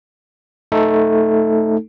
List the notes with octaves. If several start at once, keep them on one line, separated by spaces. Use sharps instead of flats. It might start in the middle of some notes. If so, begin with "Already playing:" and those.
A3 D#4 A4